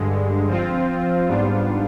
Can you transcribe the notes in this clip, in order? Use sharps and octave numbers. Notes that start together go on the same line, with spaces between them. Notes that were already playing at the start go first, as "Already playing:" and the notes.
Already playing: G2 D3 G#3
F3 C4 F4
G#2 G3 B3 D4 F4